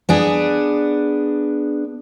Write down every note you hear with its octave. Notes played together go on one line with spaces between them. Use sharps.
B3 D4 G#4